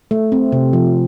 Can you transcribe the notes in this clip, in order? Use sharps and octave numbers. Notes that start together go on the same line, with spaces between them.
A3
C4
C3
F3